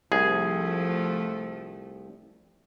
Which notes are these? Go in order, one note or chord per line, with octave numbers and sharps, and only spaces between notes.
C2 F3 A3 G#4